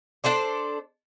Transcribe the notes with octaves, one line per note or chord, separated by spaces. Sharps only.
D4 A4 C5 D5